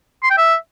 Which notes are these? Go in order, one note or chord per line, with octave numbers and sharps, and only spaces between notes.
C6
G5
E5